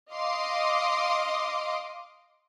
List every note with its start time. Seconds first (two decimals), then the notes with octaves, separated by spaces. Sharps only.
0.13 D#5 F5 C6 D6